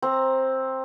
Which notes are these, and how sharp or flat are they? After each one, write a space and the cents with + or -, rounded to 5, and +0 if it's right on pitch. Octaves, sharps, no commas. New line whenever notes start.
C4 +10 A#5 +0